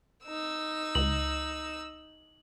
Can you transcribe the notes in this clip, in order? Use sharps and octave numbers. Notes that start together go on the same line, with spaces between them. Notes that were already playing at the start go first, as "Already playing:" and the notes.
D#4 E6
C#2 F#7